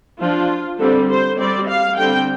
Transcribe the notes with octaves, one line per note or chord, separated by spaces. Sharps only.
F3 D4 F4
D3 G3 C4 A4
C5
G3 C4 D5
F5
D3 G3 C4 G5